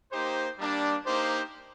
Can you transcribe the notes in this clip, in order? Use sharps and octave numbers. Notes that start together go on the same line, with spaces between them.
A#3 D#4 G4 C5
G3 A#3 D4
A#3 D#4 G4 C5